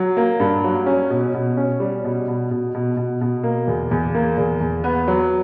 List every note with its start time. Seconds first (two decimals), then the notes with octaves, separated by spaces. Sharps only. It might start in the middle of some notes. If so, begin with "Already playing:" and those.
Already playing: F#3
0.17 A#3
0.40 G2
0.64 F#3
0.86 C#4
1.10 B2
1.34 B2
1.57 C#4
1.80 G3
2.04 B2
2.28 B2
2.51 B2
2.74 B2
2.97 B2
3.21 B2
3.43 A#3
3.68 E2
3.91 E2
4.15 A#3
4.37 E2
4.61 E2
4.84 B3
5.08 F#3